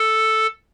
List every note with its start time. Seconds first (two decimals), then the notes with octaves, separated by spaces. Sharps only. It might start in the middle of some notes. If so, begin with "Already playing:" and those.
Already playing: A4